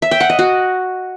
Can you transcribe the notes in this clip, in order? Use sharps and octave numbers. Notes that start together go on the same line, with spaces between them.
E5
G5
F#5
D#5
F#4